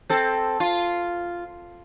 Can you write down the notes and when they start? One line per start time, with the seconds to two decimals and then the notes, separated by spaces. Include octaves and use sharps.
0.10 C4 A4
0.60 F4